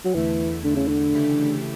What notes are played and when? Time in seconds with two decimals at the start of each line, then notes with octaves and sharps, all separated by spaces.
0.05 F#3
0.14 E2 D3 E3 A3 E4
0.64 D3
0.76 C#3
0.88 D3
1.13 C#3 E3 A3 E4 G4